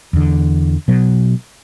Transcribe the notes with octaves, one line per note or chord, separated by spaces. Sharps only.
E2 D3
B2 F#3